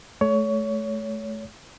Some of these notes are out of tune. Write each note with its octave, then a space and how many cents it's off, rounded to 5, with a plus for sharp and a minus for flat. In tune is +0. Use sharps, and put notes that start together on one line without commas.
A3 -30 C#5 +20